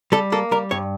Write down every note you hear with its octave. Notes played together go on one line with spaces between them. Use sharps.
G3 A4
A#3 A4
G3 A#4
G2 C#5